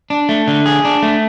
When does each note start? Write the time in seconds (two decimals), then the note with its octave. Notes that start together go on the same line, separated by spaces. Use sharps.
0.10 D4
0.29 A3
0.48 D3
0.66 G#4
0.85 D4
1.03 A3